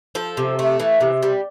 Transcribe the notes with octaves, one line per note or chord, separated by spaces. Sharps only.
F3 A4
C3
A3
E3
C3
G3